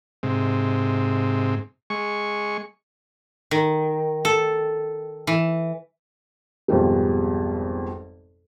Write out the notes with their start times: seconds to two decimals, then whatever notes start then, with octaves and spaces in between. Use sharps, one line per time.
0.23 G#2 C3
1.90 G#3 C#6
3.51 D#3
4.25 A4
5.27 E3
6.68 G#1 F2 B2 G3 G#3